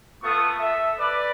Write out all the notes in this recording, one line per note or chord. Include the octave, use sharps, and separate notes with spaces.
A3 B3 F4 A4 C#6 D#6
A4 E5
B4 D5